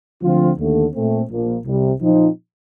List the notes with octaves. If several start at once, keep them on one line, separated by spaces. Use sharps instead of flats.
D2 D3 F3 C4 F4
D#2 D3 A3
A#2 A3 C4
A#1 A#2 F3 A#3
C2 C3 G3
A#2 F3 C4 D#4